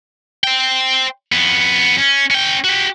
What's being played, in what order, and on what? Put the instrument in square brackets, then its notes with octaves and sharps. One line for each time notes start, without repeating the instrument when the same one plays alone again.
[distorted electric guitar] C5 G5
F2 B3
C#4
C#4 G5
F#4 G4